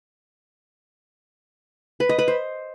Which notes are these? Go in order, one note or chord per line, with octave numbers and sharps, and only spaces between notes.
B4
D#5
B4
C5